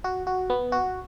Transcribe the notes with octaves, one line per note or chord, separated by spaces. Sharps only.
F#4
F#4
B3
F#4